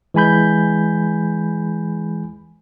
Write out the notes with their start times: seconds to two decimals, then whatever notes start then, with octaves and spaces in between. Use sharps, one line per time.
0.14 E3 G#3 G#5 B5 G6